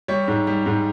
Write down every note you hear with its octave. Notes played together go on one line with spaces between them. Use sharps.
G3 C#5
G#2
G3
G#2